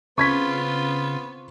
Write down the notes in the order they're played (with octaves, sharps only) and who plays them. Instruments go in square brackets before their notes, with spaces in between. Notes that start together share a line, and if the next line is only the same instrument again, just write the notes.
[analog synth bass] C#3 [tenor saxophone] B3 [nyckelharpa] C4 F4 [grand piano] C#6 G#6 B6